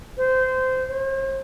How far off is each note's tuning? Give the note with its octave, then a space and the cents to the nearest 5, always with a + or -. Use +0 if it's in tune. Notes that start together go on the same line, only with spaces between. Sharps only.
C5 -20
C5 +45